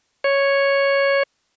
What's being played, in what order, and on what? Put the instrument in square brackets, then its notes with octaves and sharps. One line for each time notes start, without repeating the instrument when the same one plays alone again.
[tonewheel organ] C#5